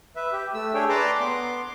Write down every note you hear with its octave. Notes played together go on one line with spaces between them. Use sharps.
B4 E5
G4
A3 E6
D4 G#4 A4 C#5 G5
B4 D5 A5 A#5 C6 D6
B3 C6 D6